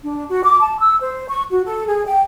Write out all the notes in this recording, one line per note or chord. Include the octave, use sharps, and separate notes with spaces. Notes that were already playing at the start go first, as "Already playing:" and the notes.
D4
F#4
D6
A5
E6
C5
C#6
F#4
A4
G#4
G5